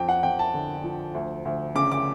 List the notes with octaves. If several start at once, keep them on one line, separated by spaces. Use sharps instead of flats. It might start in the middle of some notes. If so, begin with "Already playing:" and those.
Already playing: F2 G5
F#5
F2 G5
A5
D3
F3
D2
D2
C#3 D6
D6